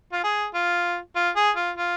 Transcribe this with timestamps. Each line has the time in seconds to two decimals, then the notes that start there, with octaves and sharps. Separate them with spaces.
0.12 F4
0.24 G#4
0.54 F4
1.15 F4
1.36 G#4
1.56 F4
1.77 F4